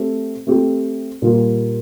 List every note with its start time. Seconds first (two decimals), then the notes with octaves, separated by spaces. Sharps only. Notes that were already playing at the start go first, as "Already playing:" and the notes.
Already playing: A3 C4 G4
0.47 A3 C4 G4
1.22 A#2 G3 A#3 F4